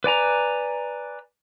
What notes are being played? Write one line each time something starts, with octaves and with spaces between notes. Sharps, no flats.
B4 D5 G#5 A#5